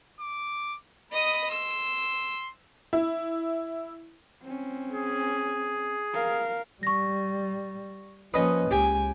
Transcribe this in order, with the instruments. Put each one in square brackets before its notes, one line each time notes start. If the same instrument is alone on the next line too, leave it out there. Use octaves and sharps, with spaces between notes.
[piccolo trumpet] D6
[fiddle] D#5 D#6 [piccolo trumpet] B5
[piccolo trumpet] C6 [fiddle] E6
[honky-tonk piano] E4
[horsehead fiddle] C4 C#4
[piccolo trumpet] G#4
[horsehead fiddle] A#4 F5
[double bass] G3 [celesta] C#6 A#6
[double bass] F3 A#3 [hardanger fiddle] C#4 [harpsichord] B4 D#5 [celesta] D#6
[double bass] C#2 [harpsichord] G4 [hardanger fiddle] G#5